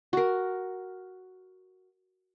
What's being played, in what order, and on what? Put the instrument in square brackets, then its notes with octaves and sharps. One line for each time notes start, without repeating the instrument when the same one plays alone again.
[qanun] F#4 A#4